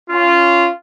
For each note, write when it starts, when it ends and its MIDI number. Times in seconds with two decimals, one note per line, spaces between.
0.10 0.69 61
0.10 0.69 65